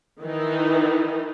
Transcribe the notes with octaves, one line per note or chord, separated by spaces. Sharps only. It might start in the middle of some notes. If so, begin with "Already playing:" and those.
D#3 E3 D#4